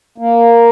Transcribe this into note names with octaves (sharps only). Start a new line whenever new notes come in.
A#3